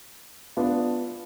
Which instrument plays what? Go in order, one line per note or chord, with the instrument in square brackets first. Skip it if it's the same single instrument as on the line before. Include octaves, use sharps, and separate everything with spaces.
[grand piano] B3 D4 F4